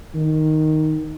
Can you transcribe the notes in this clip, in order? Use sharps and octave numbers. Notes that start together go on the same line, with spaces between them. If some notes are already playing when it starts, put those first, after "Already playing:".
D#3